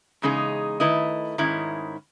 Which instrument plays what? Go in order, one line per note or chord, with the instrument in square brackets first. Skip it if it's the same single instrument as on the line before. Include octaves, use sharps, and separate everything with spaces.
[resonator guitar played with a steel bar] E2 C#3 G#3 D#4 G#4
D#3 A3 E4 B4 D#5
G#2 D#3 G#3 C#4 E4